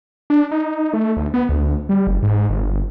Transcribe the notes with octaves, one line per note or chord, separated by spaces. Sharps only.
D4
D#4
A3
D2
B3
D2
G3
F#1
G#2
G1